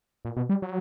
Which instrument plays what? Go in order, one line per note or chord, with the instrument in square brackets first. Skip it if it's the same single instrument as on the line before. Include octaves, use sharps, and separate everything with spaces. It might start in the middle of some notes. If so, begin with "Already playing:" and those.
[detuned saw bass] A#2
B2
G3
F#3